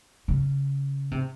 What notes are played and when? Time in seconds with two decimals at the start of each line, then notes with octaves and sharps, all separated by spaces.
0.28 C#3
1.11 C3